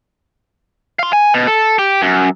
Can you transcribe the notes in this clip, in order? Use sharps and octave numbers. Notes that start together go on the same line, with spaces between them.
F5 C6
G#5
B2
A4
G4
F#2